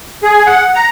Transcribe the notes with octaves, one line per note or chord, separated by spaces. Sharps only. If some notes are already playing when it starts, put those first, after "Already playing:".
G#4
F#5
A#5